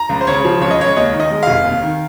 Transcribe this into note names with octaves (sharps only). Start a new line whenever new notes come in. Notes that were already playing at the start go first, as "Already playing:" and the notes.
Already playing: A#5
C#2
C5
C#3 C#5
F3
C#2 C#5
D#5
C#2 C#5
D#2 D#5
D#3
D#5
G#3
F1 F5
D#2
D#3